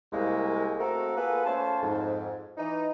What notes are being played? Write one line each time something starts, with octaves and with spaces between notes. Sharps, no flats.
C2 G#3 A#3
A3 A#3 C4 F#4 A4 A#4
A#3 B3 F4 G#4 A4 B4
A3 C#4 F4 C5 A5
F2 G#2
E3 D#4